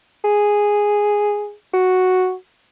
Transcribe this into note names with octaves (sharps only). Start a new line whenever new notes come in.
G#4
F#4